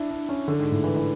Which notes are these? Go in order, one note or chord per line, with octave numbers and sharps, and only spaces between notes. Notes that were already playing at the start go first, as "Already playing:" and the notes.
Already playing: D4 E4
D4
C#4
D3
G#2
A2
E3
E3